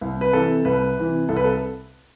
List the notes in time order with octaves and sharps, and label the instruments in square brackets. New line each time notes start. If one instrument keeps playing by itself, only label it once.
[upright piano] C2
B4
C3 E3 A4
C2 B4
C3 E3
C2 A4
B4
A4